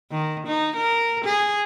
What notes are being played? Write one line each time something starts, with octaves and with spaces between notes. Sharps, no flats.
D#3
D#4
A#4
G#4